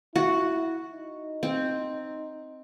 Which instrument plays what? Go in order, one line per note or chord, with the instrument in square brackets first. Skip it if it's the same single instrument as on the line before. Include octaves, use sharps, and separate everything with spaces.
[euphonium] E4 [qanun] F#4
[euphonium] D#4
[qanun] C4